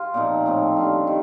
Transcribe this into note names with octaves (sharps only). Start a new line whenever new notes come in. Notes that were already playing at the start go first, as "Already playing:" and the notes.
Already playing: F4 G4
A#2 F3 C4 D#4
A2 A3 C4
G3 D4 F4
D#3